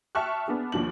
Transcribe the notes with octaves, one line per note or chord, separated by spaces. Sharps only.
E5 G5 A5 C#6 F6 F#6
B3 D4 G#4
D#2 F3 D4 F#7